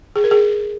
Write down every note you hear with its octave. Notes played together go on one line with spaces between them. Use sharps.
G#4
A#4
G#4